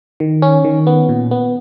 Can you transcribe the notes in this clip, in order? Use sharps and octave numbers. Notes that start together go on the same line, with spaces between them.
D#3
C#4
D#3
B3
A#2
B3